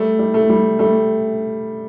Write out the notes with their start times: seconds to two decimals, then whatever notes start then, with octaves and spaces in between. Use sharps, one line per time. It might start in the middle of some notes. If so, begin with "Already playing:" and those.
Already playing: G3 A3
0.19 G3
0.34 A3
0.49 G3
0.79 G3 A3